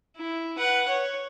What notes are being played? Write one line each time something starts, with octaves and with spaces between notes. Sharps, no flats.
E4
B4 F#5
C#5